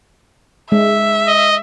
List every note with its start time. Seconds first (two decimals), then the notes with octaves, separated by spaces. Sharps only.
0.72 G#3 E5
1.28 D#5